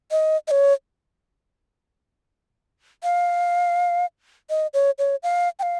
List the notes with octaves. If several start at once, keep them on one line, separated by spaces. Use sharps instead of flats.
D#5
D#5
C#5
F5
D#5
C#5
C#5
F5
G5
F5